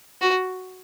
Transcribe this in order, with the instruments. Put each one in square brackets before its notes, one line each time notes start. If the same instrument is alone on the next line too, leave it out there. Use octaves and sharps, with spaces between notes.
[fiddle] F#4